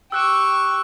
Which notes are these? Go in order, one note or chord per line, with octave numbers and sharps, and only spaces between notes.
G4 C#6 E6 F#6 E7